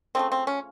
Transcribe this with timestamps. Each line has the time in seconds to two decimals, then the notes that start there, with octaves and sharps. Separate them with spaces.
0.15 C#3 F3 A3 C4
0.32 C4
0.47 C#4